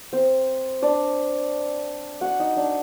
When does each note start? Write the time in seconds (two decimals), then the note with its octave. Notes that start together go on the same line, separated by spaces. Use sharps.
0.13 C4 C5
0.82 D4 D5
2.21 F#4 F#5
2.40 D#4 D#5
2.56 D4 D5